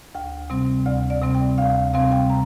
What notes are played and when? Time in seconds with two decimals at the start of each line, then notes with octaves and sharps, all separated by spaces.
0.15 D2 G5
0.50 C3 G3 C4
0.86 D2 D5
1.10 D5
1.22 C3 G3 C4
1.35 G5
1.58 D2 F5
1.94 C3 G3 C4 F5
2.12 G5
2.30 A#5